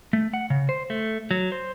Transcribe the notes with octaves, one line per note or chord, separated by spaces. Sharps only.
A3
F#5
C#3
C5
A3
F#3
C5